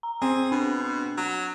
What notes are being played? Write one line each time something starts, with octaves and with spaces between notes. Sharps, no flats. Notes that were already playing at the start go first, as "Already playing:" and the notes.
A#5
C4 G#4
B2 D4
F#3